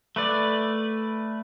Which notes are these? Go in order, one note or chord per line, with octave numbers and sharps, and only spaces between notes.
A3 B4 D5